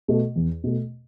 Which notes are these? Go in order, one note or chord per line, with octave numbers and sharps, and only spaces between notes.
B2 A3
E2
B2 A3